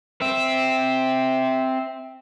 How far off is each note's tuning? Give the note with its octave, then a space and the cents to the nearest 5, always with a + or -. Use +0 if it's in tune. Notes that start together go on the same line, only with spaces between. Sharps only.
C4 +0 E5 -10